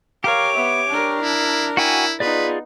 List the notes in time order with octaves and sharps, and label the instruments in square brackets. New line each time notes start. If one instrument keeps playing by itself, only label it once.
[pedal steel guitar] G4 C#5 [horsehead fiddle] A#4 F5 [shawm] D6
[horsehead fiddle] B3 E5
D4 A#4
[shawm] E4
[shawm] E4 [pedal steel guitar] F#4 G5 G#5
[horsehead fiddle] B3 D#4 [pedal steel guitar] F4 G#4 D5 [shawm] B4